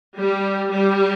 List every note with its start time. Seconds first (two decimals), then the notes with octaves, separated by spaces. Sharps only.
0.18 G3
0.70 G3